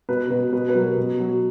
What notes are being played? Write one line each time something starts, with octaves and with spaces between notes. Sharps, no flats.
B2 B4
B2 B4
B2 B4
B4
F#3 A#4
B2
F#3